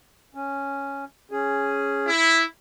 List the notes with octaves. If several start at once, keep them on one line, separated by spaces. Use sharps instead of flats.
C#4
C#4 G#4
E4